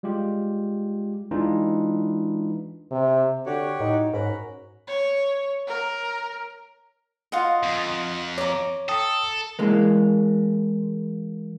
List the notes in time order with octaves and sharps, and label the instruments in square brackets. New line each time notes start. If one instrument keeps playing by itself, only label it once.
[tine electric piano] G3 G#3 F4 G4
E3 G#3 D4 D#4 F4
[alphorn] C3
[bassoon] D3 [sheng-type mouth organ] F#4 G4 C#5
[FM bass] A2 [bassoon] D#4
[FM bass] G#2 [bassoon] C#4 [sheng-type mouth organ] F#4 A#4 B5
[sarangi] C#5
A#4
[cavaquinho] F4 F#4 D#5
[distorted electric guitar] F2
[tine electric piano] C#5 [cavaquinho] A#5 D6
[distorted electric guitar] A4 [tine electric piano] G5 D#6
[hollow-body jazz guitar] E3 G#3 A#3